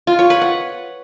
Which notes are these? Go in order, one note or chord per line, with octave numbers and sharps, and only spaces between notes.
F4
C#5
B4
F#5